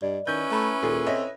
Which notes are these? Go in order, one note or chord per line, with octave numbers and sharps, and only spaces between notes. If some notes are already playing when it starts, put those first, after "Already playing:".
G2 D5 D#5
D#3 C#4 E4 B4 G6
A3 E5 A#5 B5
D#2 A#2 G#4 A4
C4 C#5 D#5 E5